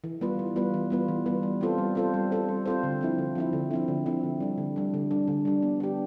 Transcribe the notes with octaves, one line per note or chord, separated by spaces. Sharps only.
E3
G3 B3 F4 B4
E3
G3 B3 F4 B4
E3
G3 B3 F4 B4
E3
G3 B3 F4 B4
G3
C4 F4 A4 C5
G3
C4 F4 A4 C5
G3
C4 F4 A4 C5
G3
C4 F4 A4 C5
D3
F3 C4 E4
D3
F3 C4 E4
D3
F3 C4 E4
D3
F3 C4 E4
D3
G3 D4
D3
G3 D4
D3
G3 D4
D3
G3 D4
B3
D4 G4